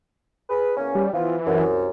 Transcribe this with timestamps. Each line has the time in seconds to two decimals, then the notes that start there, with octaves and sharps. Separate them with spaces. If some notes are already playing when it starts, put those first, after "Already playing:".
0.50 G#4 B4
0.77 E2 A#3 C#4
0.95 G3
1.13 E3 F3 B3 F4
1.46 C2 F#2